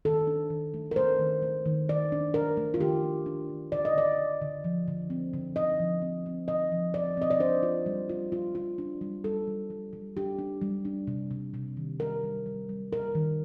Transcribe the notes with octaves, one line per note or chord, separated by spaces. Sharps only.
D#3 A4
D4
D#3
A3
A#4
A3 C5
D#3
A3
D#3
D#3 D5
D4
D4 A#4
A3
F4
D#3 G4
D4
D4
D#3
D3 D5
D#5
D3 D5
D3
D3
F3
D3
C4
D3
D3 D#5
F3
C4
C4
D3 D#5
F3
C4 D5
C4 D#5
D5
D4 C5
F4
G3
F4
F4
F4
D4
G3
G3 A4
G3
G3
G3
D4 G4
D4
G3
D4
C3
C3
C3
D#3
G3 A#4
G3
G3
G3
G3 A#4
D#3